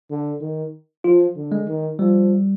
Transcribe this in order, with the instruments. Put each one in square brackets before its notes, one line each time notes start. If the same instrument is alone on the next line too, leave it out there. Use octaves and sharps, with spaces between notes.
[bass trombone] D3
D#3
[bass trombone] F3 [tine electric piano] F4
[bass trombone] D3
[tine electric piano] G#3
[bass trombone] D#3
[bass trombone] F3 [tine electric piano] G3